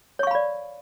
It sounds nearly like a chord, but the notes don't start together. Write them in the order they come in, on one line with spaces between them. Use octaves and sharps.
C#5 C#6 F5 B5 D5